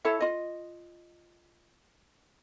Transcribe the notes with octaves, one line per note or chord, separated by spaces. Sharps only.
E4 A4 C#5 E5
F4 D#5